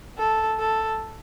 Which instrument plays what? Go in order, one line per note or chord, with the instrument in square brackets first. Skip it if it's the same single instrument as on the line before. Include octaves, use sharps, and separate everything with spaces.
[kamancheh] A4
A4